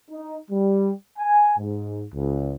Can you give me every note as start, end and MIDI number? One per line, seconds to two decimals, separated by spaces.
0.11 0.37 63
0.51 0.92 55
1.19 1.54 80
1.58 2.04 44
2.14 2.54 37